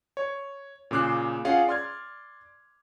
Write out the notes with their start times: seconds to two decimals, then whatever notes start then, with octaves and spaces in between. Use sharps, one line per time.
0.17 C#5
0.91 A#2 C#3 D6 F#6 C7
1.45 C#4 F4 G#4 F5 F#5
1.67 D5 C6 F6 G#6